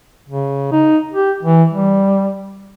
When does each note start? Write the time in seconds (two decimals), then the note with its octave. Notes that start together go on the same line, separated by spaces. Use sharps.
0.29 C#3
0.72 D#4
1.13 G4
1.43 E3
1.71 G3